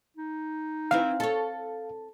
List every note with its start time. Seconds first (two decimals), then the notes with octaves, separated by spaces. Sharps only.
0.17 D#4
0.91 E3 C4 E4 F5
1.20 A4 C#5